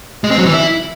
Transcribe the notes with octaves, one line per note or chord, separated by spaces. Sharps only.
G#3
C4
F#3
E3
E4